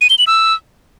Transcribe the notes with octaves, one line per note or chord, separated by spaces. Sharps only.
D#7
G7
F#7
E6